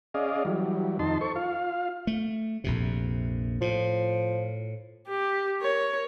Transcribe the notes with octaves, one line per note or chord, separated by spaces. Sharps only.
C#4 G#4 D5 D#5 F5
E3 F#3 G3
F2 D#3 D#4 A5 C6
A4 C5 C#6
F4 F5
A3
A#1 F2 C3
A2 F3
G4
A#4 C#5